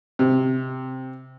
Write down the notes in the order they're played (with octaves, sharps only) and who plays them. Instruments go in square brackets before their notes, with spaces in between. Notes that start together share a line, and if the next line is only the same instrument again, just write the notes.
[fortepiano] C3